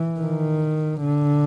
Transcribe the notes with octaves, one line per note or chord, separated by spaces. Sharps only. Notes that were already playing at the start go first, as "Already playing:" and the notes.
Already playing: E3
D#3
D3